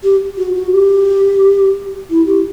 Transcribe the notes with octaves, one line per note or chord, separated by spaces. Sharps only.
G4
F#4
F#4
G4
E4
G4